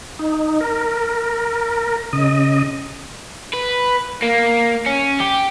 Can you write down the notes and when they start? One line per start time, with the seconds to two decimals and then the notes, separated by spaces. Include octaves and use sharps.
0.19 D#4
0.61 A#4
2.13 C#3 D#5
3.53 B4
4.22 A#3
4.86 C#4
5.21 G4